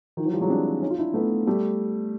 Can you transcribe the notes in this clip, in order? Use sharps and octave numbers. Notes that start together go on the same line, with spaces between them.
D#3 F3
E3 F#3
F3 G3
F#3 G#3
C4 D4
C#4 D#4
F4
D4 E4
A3 B3
G3 A3